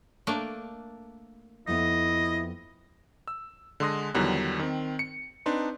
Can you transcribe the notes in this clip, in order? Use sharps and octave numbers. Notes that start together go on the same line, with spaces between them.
A3 A#3 D4
F2 B3 E4 D#5
E6
D3 G#3 C6 D#6 A#6
E2 D3 D#3 F#3 G3 F#6
D#3 C4
C#7
C4 D4 D#4 B4 C6